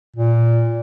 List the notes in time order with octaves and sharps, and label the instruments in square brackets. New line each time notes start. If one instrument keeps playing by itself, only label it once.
[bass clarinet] A#2